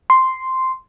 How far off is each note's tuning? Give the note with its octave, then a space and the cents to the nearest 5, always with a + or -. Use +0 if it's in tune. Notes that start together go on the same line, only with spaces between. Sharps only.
C6 -5